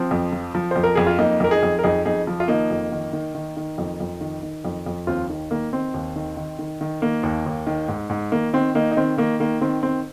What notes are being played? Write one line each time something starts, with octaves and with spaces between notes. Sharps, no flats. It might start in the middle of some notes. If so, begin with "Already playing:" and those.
Already playing: F3 C4
F2
F3
F3
F2 C5
A#4
F2 G#4
F4
F2 A#3 D#4
F2 A#4
D#4 G#4
F2
A#4
F2 D#4 G#4
F2 D#4 G#4
F3
F4
D#3 A#3 D#4
F2
D#3
D#3
D#3
D#3
F2
F2
D#3
D#3
F2
F2
D#2 C4 F4
D#3
D#3 A#3
D#3 C4
D#2
D#3
D#3
D#3
D#3
D#3 A#3
D#2
D#2
D#3
G#2
G#2
D#3 A#3
D#3 C4
D#3 A#3 D#4
D#4
D#3 C4
D#3 A#3
D#3 A#3
D#3 C4
D#3 C4